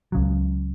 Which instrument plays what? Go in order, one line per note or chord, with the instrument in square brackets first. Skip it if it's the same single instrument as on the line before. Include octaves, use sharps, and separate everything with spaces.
[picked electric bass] C#2 C#3 F#3